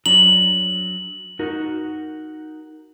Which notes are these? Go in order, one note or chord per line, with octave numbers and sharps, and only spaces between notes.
F#3 D4 A#5 F#7
D#4 F#4 A#4